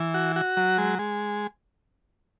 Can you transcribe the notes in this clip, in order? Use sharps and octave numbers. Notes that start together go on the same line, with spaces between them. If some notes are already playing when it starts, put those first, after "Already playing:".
Already playing: E3
F#4
F#4
F#3
G#3
G#3